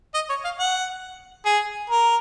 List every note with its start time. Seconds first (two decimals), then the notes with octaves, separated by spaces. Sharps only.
0.14 D#5
0.30 C#5
0.44 F5
0.59 F#5
1.46 G#4
1.90 A#4